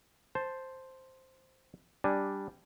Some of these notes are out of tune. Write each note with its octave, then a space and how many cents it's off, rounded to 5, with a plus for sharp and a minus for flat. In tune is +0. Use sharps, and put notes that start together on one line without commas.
C5 +0 A5 +0
G3 +0 D4 +0 G#5 +0